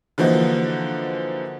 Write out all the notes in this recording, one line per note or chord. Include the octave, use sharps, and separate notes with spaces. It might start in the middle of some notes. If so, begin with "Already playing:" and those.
D3 E3 F3 A#3 D#4 F#4